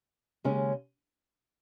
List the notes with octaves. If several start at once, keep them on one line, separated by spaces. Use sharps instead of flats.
D#2 C#3 G#3 C#4